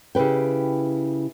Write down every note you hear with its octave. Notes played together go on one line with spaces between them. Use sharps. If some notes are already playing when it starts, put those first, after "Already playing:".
C#3 E4 G4 B4 G5